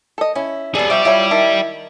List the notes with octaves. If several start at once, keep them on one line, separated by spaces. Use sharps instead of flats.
A4 D#5
C#4 E4
G3 B3 G#4 A4
F3 F#4 D5 E5 G5
E4 F4 C#5 A#5
D#3 E5 A5